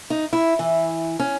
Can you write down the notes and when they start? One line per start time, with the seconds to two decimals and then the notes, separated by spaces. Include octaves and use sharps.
0.10 D#4
0.33 E4
0.59 E3
1.19 C#4